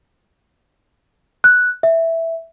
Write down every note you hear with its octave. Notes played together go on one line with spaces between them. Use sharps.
F#6
E5